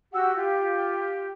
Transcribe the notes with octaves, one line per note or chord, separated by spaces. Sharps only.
F#4 G4 F#5 E6
F4 G4